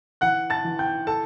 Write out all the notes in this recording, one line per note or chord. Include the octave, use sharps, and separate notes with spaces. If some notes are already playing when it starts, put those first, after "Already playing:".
E3 F#5 F#6
A5 A6
E3
G5 G6
A4 A5